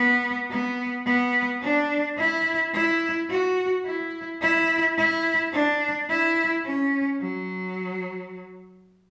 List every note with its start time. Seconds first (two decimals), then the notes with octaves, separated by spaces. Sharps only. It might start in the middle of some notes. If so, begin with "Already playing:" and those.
Already playing: B3
0.50 B3
1.06 B3
1.62 D4
2.18 E4
2.73 E4
3.30 F#4
3.85 E4
4.41 E4
4.98 E4
5.52 D4
6.09 E4
6.65 C#4
7.21 F#3